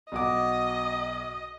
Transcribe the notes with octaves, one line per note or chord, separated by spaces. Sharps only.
B1 F#4 D#5 D6